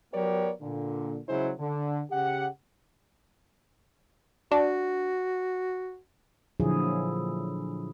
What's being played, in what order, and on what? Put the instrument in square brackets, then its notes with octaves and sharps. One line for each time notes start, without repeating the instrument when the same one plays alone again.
[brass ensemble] F#3 B3 G4 A#4 C#5 D5
A#2 D3
C#3 F#3 G#3 E4 G#4 C5
D3
C#3 G4 F#5
[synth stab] D4 [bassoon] F#4
[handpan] A#2 D3 F3 F#3 E4 G#4